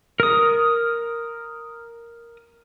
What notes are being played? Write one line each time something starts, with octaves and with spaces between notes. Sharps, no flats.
A#4 D#6